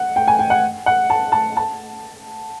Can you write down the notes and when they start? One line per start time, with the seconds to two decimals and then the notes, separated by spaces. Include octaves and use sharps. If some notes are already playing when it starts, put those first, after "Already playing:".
Already playing: F#5
0.16 G5
0.28 G#5
0.39 G5
0.50 F#5
0.86 F#5
1.10 A5
1.32 A5
1.57 A5